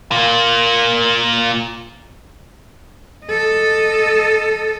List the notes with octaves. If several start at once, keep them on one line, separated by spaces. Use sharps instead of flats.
A#2 A#3
A4 D#5